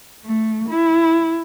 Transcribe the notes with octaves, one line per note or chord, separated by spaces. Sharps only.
A3
E4